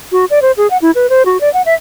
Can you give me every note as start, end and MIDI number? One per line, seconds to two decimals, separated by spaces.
0.12 0.25 66
0.30 0.42 74
0.42 0.52 72
0.57 0.70 68
0.70 0.77 78
0.82 0.91 64
0.95 1.09 71
1.10 1.23 72
1.26 1.40 66
1.41 1.52 74
1.54 1.62 78
1.66 1.74 76